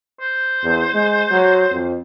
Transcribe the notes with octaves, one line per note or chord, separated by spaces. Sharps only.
C5
E2
G#3
F#3
F2